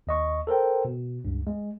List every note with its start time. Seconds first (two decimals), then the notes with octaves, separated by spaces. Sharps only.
0.07 D#2 D#5 C#6
0.47 A4 A#4 C5 G5
0.85 B2
1.25 C#2 G2
1.47 G#3